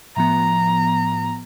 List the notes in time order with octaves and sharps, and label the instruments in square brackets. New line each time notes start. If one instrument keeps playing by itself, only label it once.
[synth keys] A2 F3 B3 [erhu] A#5